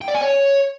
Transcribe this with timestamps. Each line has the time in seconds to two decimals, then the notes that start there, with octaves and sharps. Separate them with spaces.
0.01 G5
0.08 D5
0.14 G#5
0.21 C#5